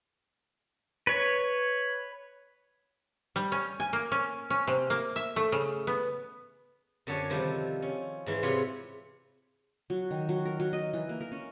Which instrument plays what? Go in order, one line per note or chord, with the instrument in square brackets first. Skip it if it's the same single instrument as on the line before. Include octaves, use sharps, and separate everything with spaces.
[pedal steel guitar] B4 C#5
[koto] G3
C#4
G#5
A#3
C#4
C#4
C3
A#3
E5
A3
C#3
B3
[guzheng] F#2 D3 A4 C#5 G#5
C3 D#3 F3 G3
C#4
G#2 E3
C3 F4 B4 C#5
[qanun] F#3
D#3
F#3
A#4
F#3
D#5
E3
A#3
A#4
C#4